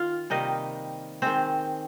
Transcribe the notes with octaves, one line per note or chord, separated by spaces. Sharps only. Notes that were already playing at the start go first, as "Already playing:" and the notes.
Already playing: D#3 F4 F5
C3 D#3 G3 A#3 D#4 D#5
D#3 G#3 C4 C5